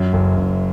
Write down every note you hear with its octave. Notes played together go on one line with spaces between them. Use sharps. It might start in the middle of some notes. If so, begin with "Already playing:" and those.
Already playing: F#2
F#1
F#1